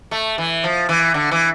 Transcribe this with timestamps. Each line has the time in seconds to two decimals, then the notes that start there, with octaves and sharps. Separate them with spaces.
0.11 A3
0.38 E3
0.64 F3
0.89 E3
1.14 D3
1.31 E3